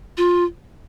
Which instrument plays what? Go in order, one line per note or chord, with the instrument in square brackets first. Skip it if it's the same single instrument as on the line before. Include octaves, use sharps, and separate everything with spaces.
[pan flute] F4